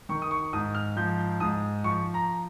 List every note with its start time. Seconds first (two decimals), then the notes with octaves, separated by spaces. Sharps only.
0.09 D#3 C#6
0.22 D#6
0.31 C#6
0.53 G#2 D#6
0.75 F6
0.96 F3 G6
1.40 G#2 D#6
1.84 F3 C#6
2.14 A#5